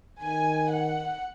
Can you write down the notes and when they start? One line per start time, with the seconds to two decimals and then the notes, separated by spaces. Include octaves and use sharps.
0.21 D#3 G#5
0.69 F#5